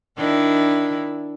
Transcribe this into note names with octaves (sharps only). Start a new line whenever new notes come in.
D#3 D4 E4